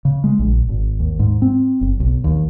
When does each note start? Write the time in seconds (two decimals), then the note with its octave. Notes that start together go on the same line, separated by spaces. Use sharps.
0.05 C#3
0.24 G#3
0.39 A#1
0.69 G#1
1.00 D#2
1.19 G#2
1.42 C4
1.81 F#1
2.00 B1
2.24 D#2